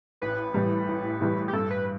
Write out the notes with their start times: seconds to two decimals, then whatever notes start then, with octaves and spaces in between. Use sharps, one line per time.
0.22 A1 B4
0.54 A2 E3 G3
0.88 A1
1.21 A2 E3 G3
1.48 G4
1.53 G2 A4
1.70 B4